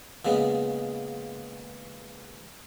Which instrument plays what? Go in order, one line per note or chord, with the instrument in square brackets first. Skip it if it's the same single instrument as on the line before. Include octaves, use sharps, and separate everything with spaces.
[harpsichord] A#2 C#3 G#3 B3